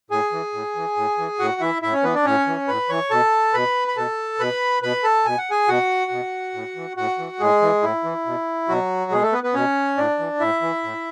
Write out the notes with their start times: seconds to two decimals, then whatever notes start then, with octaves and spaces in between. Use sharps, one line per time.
0.10 A2 G#4 G#5
0.32 E3
0.53 A2
0.75 E3
0.96 A2
1.18 E3
1.39 A2 F#4 F#5
1.61 E3 E4 E5
1.82 A2 E4 E5
1.93 C#4 C#5
2.04 E3 B3 B4
2.15 D4 D5
2.25 A2 C#4 C#5
2.47 E3
2.68 A2 B4 B5
2.89 E3 C#5 C#6
3.11 B2 A4 A5
3.54 B2 B4 B5
3.88 B5
3.97 B2 A4 A5
4.39 B2 B4 B5
4.82 B2 B4 B5
5.04 A4 A5
5.25 B2 G#5
5.38 F#5
5.51 G#4 G#5
5.68 B2 F#4 F#5
6.11 B2
6.54 A2
6.76 E3
6.97 A2 F#4 F#5
7.18 E3
7.40 A2 G#3 G#4
7.62 E3
7.83 A2 E4
8.04 E3
8.26 B2
8.69 B2 F#3 F#4
9.11 B2 G#3 G#4
9.22 A3 A4
9.33 B3 B4
9.43 B3 B4
9.54 B2 C#4 C#5
9.97 A2 D4 D5
10.19 E3
10.40 A2 E4 E5
10.61 E3
10.84 A2